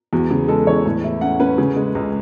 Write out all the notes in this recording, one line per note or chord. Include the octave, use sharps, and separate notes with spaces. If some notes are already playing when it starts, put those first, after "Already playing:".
E2 F#4
C#3
G#3 A4
E2 C#5
A2
E4
C#4 F#5
C#4 B4
C#3
G#3
C#2